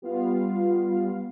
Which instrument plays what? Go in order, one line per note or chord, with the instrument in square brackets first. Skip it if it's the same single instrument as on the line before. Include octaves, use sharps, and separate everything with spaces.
[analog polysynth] G3 B3 F4 F5